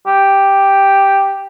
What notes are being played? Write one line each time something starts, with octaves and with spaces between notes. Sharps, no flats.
G4